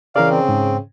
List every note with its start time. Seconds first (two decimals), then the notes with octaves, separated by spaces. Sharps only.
0.16 C#3 E3 A#4 D5 F5
0.30 C4
0.49 G#2